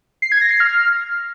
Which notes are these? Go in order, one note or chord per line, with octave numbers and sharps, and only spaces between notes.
C7
G#6
A#6
C7
F6